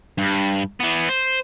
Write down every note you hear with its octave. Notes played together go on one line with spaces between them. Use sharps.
G2
E3 B3
C5